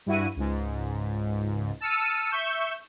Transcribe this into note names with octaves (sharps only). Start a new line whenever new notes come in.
G2 E4 F#4 D#7
C#2 G#2
A5 E6 F6 C#7 D#7
E5 C#6 G6 E7